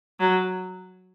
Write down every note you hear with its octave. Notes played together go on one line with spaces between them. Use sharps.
F#3